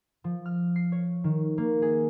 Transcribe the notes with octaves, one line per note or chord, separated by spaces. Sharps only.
F3
F6
C7
C#5
D#3
A#3
G#4